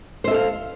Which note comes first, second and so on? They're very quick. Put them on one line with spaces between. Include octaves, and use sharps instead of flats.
C5 E5 A4 F5